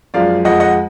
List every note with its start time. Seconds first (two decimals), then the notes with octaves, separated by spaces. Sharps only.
0.14 F#2 F3 G#3 D5 F5
0.45 F2 F3 G#3 D#5 F#5
0.60 D#5 F#5